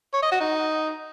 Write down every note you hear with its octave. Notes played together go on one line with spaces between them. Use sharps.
C#5
D#5
F#4
D#4